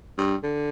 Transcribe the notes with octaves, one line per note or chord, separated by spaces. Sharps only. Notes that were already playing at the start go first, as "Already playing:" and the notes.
G2
D3